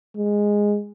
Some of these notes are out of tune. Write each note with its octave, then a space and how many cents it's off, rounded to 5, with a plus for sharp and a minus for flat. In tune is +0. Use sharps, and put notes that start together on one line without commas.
G#3 -10